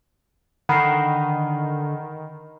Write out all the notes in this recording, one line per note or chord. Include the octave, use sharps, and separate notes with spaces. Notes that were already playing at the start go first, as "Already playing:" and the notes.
D3 D#3 F#5 B5 C7